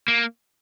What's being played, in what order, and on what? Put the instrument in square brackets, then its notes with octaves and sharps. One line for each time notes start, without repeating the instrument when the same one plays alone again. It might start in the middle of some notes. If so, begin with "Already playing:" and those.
[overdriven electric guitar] A#3